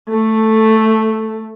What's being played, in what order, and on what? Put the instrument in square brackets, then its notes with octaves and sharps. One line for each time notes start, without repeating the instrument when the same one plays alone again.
[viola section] A3